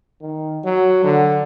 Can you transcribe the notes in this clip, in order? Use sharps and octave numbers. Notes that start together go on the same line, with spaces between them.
D#3
F#3
D3